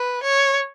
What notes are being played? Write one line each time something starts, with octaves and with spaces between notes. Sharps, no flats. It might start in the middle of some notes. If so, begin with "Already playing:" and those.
Already playing: B4
C#5